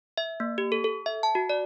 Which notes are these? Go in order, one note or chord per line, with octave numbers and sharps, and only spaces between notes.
E5
A#3
G4
A4
A4
E5
A5
F#4
D5